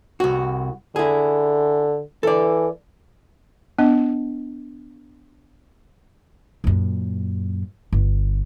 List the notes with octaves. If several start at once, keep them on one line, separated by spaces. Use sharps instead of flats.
C2 F#4
D3 E4 G#4
E3 A4 D5
B3 D4 D#5
F#2 A#2
G1